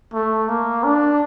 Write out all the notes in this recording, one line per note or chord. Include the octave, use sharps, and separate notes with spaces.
A3
A#3
D4